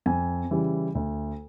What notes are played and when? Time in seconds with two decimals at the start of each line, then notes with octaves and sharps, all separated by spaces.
0.06 F2 G#5
0.51 C#3 E3 G3
0.95 D2